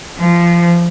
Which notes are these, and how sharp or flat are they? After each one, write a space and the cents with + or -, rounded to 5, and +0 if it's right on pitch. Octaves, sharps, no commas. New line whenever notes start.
F3 -20